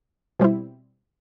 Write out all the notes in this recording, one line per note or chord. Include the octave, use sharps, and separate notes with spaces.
B2 G3 C4 E4